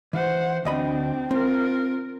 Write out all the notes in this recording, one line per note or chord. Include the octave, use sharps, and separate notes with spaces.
E3 C5 F#5
D2 C4 D4 D#5 B5
C4 F4 A#4